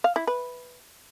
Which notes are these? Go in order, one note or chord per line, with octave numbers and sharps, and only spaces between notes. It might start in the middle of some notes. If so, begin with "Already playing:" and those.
F5
E4
B4